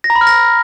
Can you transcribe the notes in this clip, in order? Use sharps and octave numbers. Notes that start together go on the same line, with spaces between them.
A#6
A#5
B5
F6
A#6